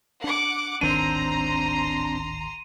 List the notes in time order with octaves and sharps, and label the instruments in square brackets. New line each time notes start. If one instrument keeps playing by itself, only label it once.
[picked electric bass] D4 [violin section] F#5 D6
[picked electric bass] D1 G#1 D#3 [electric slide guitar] C4 D4 [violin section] A#5 C6 [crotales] D#7